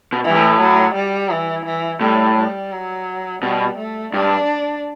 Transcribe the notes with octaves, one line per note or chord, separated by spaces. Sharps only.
B2
E3
G2
A2
F#3
G3
E3
E3
A2 G3
G3
F#3
B2 G3
A3
G2 D4